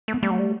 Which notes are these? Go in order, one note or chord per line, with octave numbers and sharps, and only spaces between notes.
A3
B3
G3 A3
F#3
G3